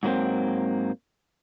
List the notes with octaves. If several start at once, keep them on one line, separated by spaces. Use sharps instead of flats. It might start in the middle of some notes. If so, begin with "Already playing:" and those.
G#2 F#3 A#3 C4